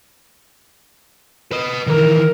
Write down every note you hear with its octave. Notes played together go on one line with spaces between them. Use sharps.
B4 D#5
D#3 E3 A#4